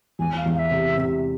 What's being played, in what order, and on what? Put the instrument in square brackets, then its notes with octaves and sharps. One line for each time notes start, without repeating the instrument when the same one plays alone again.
[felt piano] E2 [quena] G#5
[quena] F5
[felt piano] E2
[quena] F5
E5
[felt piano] C3
C3